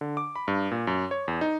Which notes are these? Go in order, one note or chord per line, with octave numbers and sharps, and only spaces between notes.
D3
D6
B5
G2
A#2
F#2
C#5
E2
D#4